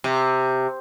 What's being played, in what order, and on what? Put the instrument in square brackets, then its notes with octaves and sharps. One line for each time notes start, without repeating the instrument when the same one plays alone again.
[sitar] C3